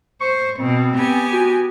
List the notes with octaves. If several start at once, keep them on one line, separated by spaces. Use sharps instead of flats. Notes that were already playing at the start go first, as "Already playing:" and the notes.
C5 C#6
B2 C4
B3 G4 G#5
F#4